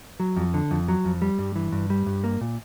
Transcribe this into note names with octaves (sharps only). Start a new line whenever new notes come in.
F#3
F2
D3
F2
F#3
F2
G3
G2
E3
G2
G3
G2
A#3
A#2